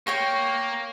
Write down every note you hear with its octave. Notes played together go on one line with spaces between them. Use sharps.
A#3 C#5 G5 C#6